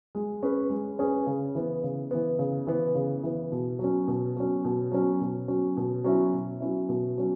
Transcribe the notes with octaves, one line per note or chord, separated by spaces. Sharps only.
G#3
C#4 G#4 B4
G#3
C#4 G#4 B4
C#3
E3 B3
C#3
E3 B3
C#3
E3 B3
C#3
E3 B3
B2
F#3 C#4
B2
F#3 C#4
B2
F#3 C#4
B2
F#3 C#4
B2
F#3 C#4 E4
B2
F#3 C#4 E4
B2
F#3 C#4